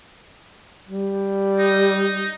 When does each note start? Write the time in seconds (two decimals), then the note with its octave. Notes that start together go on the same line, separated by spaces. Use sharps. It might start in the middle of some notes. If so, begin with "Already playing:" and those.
0.89 G3
1.59 D#4